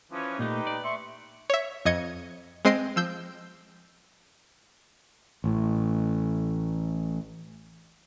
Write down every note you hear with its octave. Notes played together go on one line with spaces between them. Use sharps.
E3 F3 C#4
A#2 A3 D#4 G4 B4
D5
E5 C6 C#6
C#5 E5
F2 D#5 G#6 C#7
G#3 C4 D#5 C6 C7 D7
F3 E6 G6
A1 A2